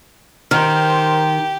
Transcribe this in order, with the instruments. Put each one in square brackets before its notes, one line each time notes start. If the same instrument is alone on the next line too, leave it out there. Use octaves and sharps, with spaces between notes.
[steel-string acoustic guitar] D#3 [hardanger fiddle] G4 [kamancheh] A#4 C5 [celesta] F6